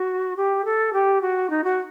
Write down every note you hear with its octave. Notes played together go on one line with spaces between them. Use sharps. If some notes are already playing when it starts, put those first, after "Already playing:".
Already playing: F#4
G4
A4
G4
F#4
D#4
F#4